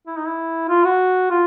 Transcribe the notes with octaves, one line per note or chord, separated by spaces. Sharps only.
E4
D#4
E4
F4
F#4
F4